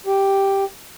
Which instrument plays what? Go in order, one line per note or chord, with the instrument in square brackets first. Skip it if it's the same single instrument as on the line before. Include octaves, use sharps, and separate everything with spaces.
[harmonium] G4